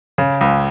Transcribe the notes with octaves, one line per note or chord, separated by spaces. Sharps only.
C#3
C#2